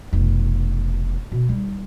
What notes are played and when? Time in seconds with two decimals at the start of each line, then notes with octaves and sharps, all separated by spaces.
0.13 F1 B2
1.32 B2
1.49 G3 D#4